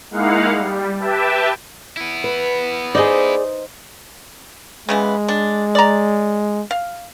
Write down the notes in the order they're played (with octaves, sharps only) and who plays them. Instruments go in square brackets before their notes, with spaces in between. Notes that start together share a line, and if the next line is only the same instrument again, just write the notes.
[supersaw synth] G#3 A#3 D#4 E4 F5 F#5
G3
G4 B4 E5 G5 A5
[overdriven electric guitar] B3 E4
[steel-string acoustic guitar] B4
[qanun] D#4 C5 D#5 [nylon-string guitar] G#4 D5
[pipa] C#3 E3 B3 [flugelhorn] G#3
[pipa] D4
D5 A#5
F5